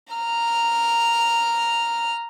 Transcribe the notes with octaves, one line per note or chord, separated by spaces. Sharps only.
A#5 F6